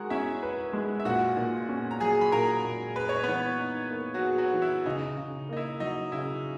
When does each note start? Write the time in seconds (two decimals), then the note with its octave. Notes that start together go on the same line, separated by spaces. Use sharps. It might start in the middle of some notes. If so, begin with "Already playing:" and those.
Already playing: G#3 F#4 G#4 A#4 F#5
0.10 C#4 E4 E5
0.43 B4
0.73 G#3
1.00 E5
1.05 A#2 F#4 F#5
1.37 A#2
1.69 C#4
1.91 A#5
2.00 F#3 G#4 G#5
2.21 B5
2.32 A#2 A#4 A#5
2.65 A#2
2.96 G#4 B4
3.09 C#5
3.23 E3 B3 B4
3.59 D#4
3.90 A#3
4.14 F#3 F#4
4.22 G#4
4.38 F#3 F#4
4.54 E3
4.62 E4
4.86 C#3 D#4
5.17 C#3
5.49 A#3 D#4
5.57 E4
5.80 F#3 D#4
6.12 C#3 E4